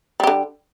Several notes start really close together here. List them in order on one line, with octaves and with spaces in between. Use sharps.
G3 G4 D3